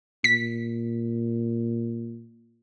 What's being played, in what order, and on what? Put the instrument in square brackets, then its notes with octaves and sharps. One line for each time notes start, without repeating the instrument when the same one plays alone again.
[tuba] A#2 [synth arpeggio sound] B6